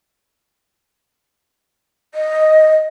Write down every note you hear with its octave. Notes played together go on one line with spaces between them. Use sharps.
D#5